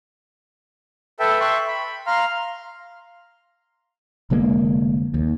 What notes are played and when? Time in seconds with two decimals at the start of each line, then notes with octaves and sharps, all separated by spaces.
1.20 A4 B4 E5 G5
1.40 E5 G5 C6 C#6 F#6
1.67 B5
2.07 F5 A#5 C6 F6
4.30 F1 D3 G#3 A#3
5.14 D#2